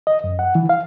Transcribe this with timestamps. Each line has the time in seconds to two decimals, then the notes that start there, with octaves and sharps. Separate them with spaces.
0.07 D#5
0.24 F#2
0.39 F#5
0.55 E3
0.69 F5